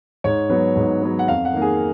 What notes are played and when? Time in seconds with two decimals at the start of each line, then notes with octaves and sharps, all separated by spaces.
0.24 G#2 C#5
0.50 F#3 B3
0.76 G#2
1.02 F#3 B3
1.19 F#5
1.28 F2 F5
1.45 F#5
1.53 D#3 A#3
1.62 G#4